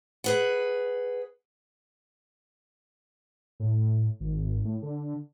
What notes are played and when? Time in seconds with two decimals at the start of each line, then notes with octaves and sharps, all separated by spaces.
0.24 G#4 B4 F#5
3.60 A2
4.20 G#1
4.65 A2
4.82 D3